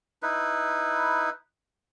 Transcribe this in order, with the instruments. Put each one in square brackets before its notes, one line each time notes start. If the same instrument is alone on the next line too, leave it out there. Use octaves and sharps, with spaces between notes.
[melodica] D#4 E4 B4